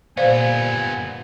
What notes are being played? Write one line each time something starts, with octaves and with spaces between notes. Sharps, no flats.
A#2 G3 B3 C5 D5 F5 G#5